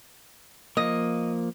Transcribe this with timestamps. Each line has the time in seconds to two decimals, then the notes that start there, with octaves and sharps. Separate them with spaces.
0.77 F3 A#3 D#5